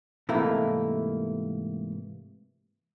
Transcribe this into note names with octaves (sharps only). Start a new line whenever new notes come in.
G#2 C3 E3 A3 A#3 E4